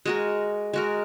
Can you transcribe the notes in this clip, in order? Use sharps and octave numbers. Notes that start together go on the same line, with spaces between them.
G#3 F#4 A#4
G#3 F#4 A#4